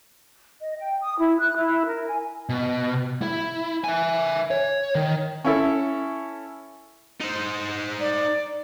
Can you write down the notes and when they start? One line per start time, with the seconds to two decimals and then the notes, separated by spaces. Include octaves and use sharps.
0.61 D#5
0.79 G5
1.01 D#6
1.19 E4
1.40 F#6
1.56 E4
1.86 A#4
2.07 G#5
2.49 B2
3.22 E4
3.84 E5 G#5
4.51 C#5
4.95 D#3
5.44 C#4 E4 A4
7.21 D#4 C5
7.99 D5